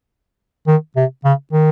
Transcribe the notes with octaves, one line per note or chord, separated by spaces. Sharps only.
D#3
C3
C#3
D#3